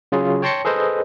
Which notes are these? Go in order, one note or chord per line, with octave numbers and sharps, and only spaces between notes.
C#3 F#3 F4 G#4
C#5 G5 A5 C6 A#6 C#7
G#4 A4 B4 C5 D#5